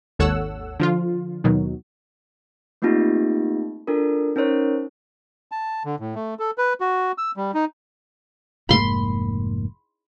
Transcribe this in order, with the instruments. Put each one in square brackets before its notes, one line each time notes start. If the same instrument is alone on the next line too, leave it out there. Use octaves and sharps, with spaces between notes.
[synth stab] G#1 D#2 A4 C#5 F#5 E6
D3 F3 F4
D#2 B2 D#3 F#3
[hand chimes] A3 A#3 C4 D#4 F4 G4
D4 F4 A4 A#4
C#4 D#4 A#4 C5 C#5
[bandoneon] A5
D3
A2
A3
A4
B4
F#4
E6
G3
D#4
[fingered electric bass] F1 G#2 A#3 [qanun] B5 C6